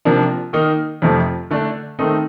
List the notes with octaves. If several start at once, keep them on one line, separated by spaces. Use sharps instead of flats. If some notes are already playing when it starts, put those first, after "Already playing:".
C3 F3 A#3 D4
D#3 A#3 D#4
F2 C3 F3 A3
D3 A3 D4
D#3 A3 C4 D#4